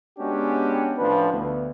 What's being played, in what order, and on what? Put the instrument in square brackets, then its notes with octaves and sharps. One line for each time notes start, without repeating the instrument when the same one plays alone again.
[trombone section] G#3 B3 C#4 D4 F#4 G4
A2 F3 C#4 D4 B4
D2 B3